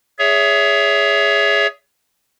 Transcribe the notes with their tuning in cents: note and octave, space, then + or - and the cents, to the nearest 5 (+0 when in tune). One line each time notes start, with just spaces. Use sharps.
G#4 +0 C#5 +25 E5 +0